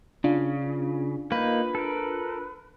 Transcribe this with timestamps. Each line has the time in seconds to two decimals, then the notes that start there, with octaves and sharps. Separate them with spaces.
0.24 C#3 D4 F4
1.32 A#3 D#4 B4
1.75 A4 A#4